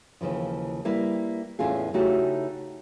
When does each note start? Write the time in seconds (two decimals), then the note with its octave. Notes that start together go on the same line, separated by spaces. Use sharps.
0.21 D#2 C#3 E3 F3
0.85 G3 A#3 E4 B4
1.59 E2 A2 E3 C#4 F4 G#4
1.94 C#3 A3 D#4 E4 F#4 G4